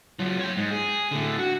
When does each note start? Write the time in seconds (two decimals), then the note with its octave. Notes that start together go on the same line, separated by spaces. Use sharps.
0.19 F#3 F4
0.39 C#5 G5
0.57 G#2
0.71 G#4
1.11 A2 D3
1.38 F#4